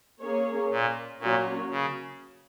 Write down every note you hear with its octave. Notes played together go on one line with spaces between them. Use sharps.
A#3 C#4 G#4 C#5
A#2
A#2 F#3 A#3 C#4 F#4 C#5
C#3